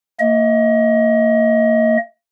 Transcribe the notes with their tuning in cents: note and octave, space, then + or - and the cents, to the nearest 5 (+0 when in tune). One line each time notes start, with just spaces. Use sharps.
A#3 -30 D#5 +25